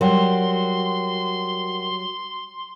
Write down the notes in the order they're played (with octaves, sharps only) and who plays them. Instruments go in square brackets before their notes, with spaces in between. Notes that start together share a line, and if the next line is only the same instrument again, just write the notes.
[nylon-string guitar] F#3 G3 [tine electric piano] A#4 F#5 G5 [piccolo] C6